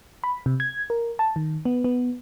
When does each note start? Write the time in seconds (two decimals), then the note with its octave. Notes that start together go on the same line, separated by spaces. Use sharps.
0.24 B5
0.46 C3
0.60 G#6
0.90 A#4
1.19 A5
1.36 D#3
1.65 B3
1.84 B3